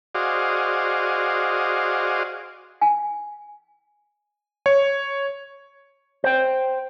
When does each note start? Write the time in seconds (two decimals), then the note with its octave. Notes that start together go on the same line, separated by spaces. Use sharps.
0.15 F#4 G#4 C5 D5 D#5 F5
2.81 G#5
4.66 C#5
6.24 C5 G5